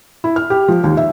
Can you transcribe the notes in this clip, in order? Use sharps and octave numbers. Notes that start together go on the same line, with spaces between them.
E4
F6
G4
F3
D#2
E5